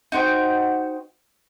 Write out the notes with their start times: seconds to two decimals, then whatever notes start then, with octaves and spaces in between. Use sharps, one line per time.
0.12 D#4 F#4 C5 G5